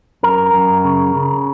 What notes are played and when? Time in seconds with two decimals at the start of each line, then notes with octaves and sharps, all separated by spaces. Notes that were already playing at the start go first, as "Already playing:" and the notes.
0.23 F#2 A#4
0.54 F#2
0.84 C#3
1.16 C#3